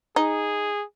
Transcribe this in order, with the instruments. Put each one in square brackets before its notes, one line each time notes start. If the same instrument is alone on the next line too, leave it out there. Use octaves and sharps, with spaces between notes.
[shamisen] D#4 [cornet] G#4